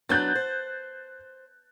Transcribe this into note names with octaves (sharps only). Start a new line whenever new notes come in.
F#3 B3 D4 F#6 G6 A6
C5